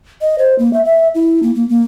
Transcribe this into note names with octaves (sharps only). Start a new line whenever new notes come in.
D#5
C5
A#3
E5
E5
E4
A#3
A#3
A#3